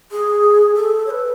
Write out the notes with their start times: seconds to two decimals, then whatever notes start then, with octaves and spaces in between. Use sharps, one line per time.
0.12 G#4
0.75 A4
1.06 C#5
1.10 B4